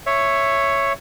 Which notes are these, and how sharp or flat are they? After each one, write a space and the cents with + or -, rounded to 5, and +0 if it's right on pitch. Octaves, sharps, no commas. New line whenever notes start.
C#5 +0 E5 +10